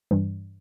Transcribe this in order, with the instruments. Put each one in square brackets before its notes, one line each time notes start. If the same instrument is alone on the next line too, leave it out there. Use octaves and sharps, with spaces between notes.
[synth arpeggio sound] G2 E3 G3